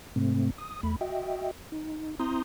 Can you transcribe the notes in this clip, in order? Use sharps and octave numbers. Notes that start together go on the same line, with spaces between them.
G#2 C3 A3 C4
D#6
E2 A3 B5
F#4 D#5 E5 G5
D#4
C4 E4 A#5 C6 D#6 G6